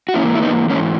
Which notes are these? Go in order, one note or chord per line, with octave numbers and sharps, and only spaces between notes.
F#4
G#2 E3 A#3 C#4 E4
E4
B3 D#4
G#2 E3 A#3 C#4